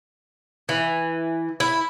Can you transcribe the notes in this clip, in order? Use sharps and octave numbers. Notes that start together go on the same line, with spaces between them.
E3
E4